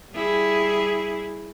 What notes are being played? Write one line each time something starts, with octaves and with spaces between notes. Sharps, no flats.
G3 E4 G#4